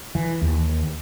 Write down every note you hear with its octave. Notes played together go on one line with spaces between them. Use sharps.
E3
D#2